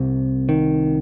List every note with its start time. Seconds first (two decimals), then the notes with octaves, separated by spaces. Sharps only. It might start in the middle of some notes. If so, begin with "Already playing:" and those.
Already playing: C2 C3
0.49 D#3